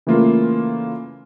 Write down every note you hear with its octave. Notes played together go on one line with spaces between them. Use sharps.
C#3 E3 A3 A#3 F4